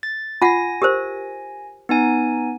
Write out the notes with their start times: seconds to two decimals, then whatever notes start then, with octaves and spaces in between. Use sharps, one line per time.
0.03 A6
0.42 F4 F#5 G#5 A#6
0.82 G4 A#4 C5
1.89 B3 D#4 G#5